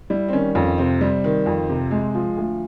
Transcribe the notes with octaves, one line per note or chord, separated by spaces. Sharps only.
G3 E4
C4
D#3 C#4
F2 C#4
C3 C4
G3
D#3
F2
C3
G#3
F3
D2